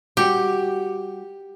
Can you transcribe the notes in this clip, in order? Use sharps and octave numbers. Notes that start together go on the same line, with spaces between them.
G3 F#4 G4